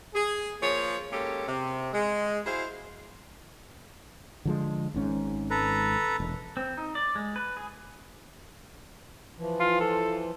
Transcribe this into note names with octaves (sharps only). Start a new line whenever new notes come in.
G#4
F3 A#3 G#4 C#5
G#3 A#3 C#4 G4 A4
C3
G#3
E4 F#4 G#4 C5 F5
D3 F3 G#3
G#1 G#2 C#4
A4 B4 A#5
E1
C4
D#4
D5
G#3
B4
G#4
E3 F3
F4
A4